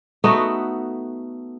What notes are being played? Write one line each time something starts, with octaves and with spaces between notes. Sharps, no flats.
A3 B3 D#4 F#4